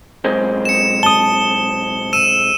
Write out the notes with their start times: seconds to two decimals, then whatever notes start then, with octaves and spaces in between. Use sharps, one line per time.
0.24 B1 G#3 C4
0.65 C#7 E7
1.03 A5 D#6 G7
2.13 E6 D#7 E7